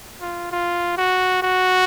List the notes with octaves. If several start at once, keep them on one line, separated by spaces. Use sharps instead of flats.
F4
F4
F#4
F#4